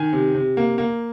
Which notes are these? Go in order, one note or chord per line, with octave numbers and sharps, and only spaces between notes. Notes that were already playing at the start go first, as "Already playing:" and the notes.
Already playing: D#3 G#5
C3
C3
A#3
A#3